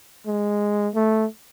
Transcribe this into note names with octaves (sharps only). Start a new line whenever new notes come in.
G#3
A3